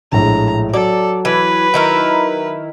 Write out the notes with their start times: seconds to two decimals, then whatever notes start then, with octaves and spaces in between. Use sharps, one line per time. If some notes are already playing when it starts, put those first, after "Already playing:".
0.12 A#1 A2 G#3 A#5
0.74 F#3 A4 D5
1.25 E3 B4
1.74 D#3 E4 A#4